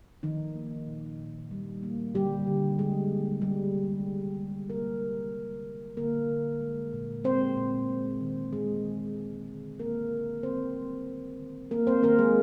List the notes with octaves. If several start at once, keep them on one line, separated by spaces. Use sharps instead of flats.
D#3 F3 D#4
A#3
A#2
A#2
G3
A#3
D3 G3 G4
D3
G3 G#3 G#4
A#3
C3 G3 G4
C3
D#3
G#3
C3 A#3 A#4
C3
G3
A#3
D3 A#3 A#4
D3
G#3
A#2
G#3 C4 C5
A#2
G#3
D#3
G#3 G#4
D#3
G#3
D3
G#3 A#3 A#4
D3
G3 C4 C5
A#3
D#3
D#3
A#3 A#4
C4 C5
D#3 A#3 A#4
G#3 G#4